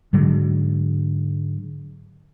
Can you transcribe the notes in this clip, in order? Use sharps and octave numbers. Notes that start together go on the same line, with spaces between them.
G#2 D3 F#3 G#3